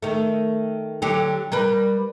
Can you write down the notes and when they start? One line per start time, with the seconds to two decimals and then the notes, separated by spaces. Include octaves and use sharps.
0.03 D#3 A3
1.02 D3 F#3 G4
1.52 G3 A#4 B4